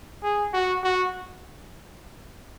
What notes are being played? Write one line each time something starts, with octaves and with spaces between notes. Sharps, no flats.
G#4
F#4
F#4